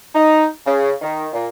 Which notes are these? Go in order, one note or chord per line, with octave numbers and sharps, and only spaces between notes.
D#4
C#3
D#3
A#2